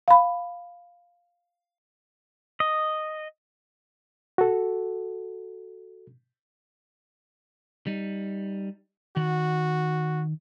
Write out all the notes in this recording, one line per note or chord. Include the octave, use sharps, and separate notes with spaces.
F5 B5
D#5
F#4 A4
G3 D#4
D#3 F#4 F#5